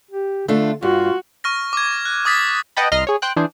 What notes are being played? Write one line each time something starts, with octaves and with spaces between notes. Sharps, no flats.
G4
D3 A3 D4 F4
G2 F4 F#4
C#6 F6 A#6
D6 G#6
F#6
D6 D#6 A6 B6
B4 D#5 F#5 G5 A5 B5
C2 D#5 A#5 C6 F6
G#4 C#5
C5 G5 F#6
E3 D4 G#4 C5